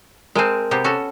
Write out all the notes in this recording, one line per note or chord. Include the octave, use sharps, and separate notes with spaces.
G#3 C4 A#4 G#5 A5
C3 B3 G4
C#4 F#4 A4